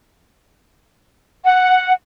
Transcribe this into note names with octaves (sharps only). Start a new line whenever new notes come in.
F#5